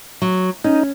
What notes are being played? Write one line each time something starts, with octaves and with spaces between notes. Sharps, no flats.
F#3
C#4 D#4